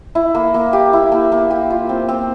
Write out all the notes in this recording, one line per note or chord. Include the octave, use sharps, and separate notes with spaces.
E4
A#3
A#3
G4
E4
A#3
A#3
G4
F4
C4
C4